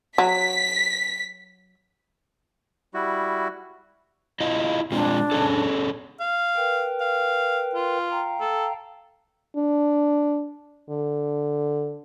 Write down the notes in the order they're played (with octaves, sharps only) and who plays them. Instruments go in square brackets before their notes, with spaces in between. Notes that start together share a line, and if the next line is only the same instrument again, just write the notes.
[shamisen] F#3 [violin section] B6
[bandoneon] G3 E4 F#4
[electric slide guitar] E4 F4 D#5
[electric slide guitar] G#3 C4 F4 [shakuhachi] D4
[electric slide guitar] C#4 G#4 A4
[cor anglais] F5
[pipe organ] A#4 B4 G5
[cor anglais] F5
F4
[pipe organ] F5 G5 A#5
[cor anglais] A4
[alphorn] D4
D3